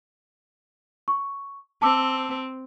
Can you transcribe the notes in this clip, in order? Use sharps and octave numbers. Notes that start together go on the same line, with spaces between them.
C#6
C4 A5 D6 E6